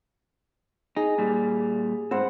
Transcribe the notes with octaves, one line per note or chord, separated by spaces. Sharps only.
D#4 G#4
A#2 G3
G#2 C4 B4 C5 F#5